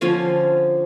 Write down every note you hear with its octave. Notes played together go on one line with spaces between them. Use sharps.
D3 F3 C#4 F5